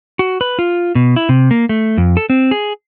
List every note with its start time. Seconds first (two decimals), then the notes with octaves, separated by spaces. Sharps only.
0.19 F#4
0.41 B4
0.59 F4
0.95 B2
1.16 E4
1.29 C3
1.51 A#3
1.69 A3
1.97 F2
2.17 A4
2.30 C4
2.51 G#4